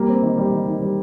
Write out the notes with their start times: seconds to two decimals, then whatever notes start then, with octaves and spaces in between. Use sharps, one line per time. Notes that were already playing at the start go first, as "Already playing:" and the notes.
Already playing: G3 A#3
0.09 C4
0.23 D#3
0.37 G3
0.52 D#3
0.68 D#3
0.81 G3